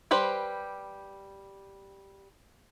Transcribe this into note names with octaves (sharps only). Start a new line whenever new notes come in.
G3 G4 B4 C5